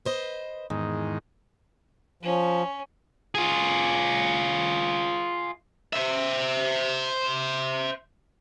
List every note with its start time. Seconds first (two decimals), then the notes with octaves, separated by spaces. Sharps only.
0.05 B4 C5 D#5
0.70 E2 G#2 D#3
2.23 F3 C#4
3.35 F4 G#4
5.93 C5 E5